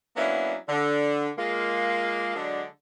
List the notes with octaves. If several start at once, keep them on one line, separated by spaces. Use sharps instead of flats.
F#3 A#3 B3 C#4 D4 E4
D3
G#3 A#3 F4
D3 F#3 G#3 D4